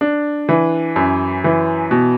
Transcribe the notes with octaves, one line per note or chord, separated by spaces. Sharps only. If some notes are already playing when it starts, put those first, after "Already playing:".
D4
E3
F#2
E3
B2